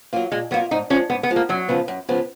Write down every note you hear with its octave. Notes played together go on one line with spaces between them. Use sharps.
F#3 A#3 F4
A#2 G#3
F#3 A#3 B3 F4
G#2 D#4
F3 G#3 C#4
G#2 B3
B3
F3 G#3
A#3
F#2 F#3
C#3 F3 G#3 B3
F#2
C#3 F3 G#3 B3